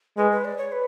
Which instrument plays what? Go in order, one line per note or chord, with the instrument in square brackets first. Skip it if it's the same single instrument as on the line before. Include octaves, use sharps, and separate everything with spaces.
[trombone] G#3 [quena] B4
[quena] B4
D5
C#5
B4